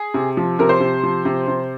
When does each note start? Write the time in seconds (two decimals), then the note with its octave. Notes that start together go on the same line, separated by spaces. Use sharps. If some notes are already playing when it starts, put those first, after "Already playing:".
Already playing: G#4
0.14 C3
0.37 F3
0.59 C3 A#4
0.69 C5
0.80 C3
1.03 F3
1.25 C3
1.48 C3